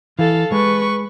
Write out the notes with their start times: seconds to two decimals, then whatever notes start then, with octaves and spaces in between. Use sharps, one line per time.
0.19 E3 A4 F5
0.52 G#3 B4 C#6